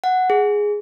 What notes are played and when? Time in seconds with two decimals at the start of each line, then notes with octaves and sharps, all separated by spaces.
0.04 F#5
0.30 G#4